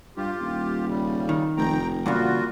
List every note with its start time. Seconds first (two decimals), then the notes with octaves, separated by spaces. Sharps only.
0.17 G2 F4 G4
0.41 D#1
0.88 C#3 G3
1.29 D#3
1.57 F1 G5 A#5
2.06 E2 G2 A#2 C#3 F4 F#4